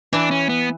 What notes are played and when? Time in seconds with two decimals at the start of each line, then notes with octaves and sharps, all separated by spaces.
0.13 E3 D4
0.31 C#4
0.49 B3